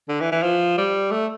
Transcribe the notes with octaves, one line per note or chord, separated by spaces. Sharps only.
D3
E3
E3
F3
G3
A3